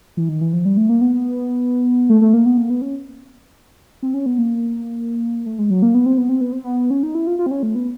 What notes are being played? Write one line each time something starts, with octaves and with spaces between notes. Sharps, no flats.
E3
D#3
E3
F3
G3
A3
A#3
B3
A3
A3
A#3
B3
A#3
B3
C#4
C4
C#4
B3
A#3
A3
G#3
F#3
A#3
B3
C4
B3
C4
B3
C4
B3
C#4
D#4
E4
F4
F4
C4
C#4
A3
B3